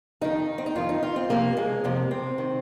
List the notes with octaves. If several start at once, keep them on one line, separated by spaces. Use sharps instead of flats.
F2 D#3 D#4
C4
D#4
F2 D#3 F4
D#4
F4
C4
F2 C3 F3 A#3
G#3
F2 C3 F3
C4
D#3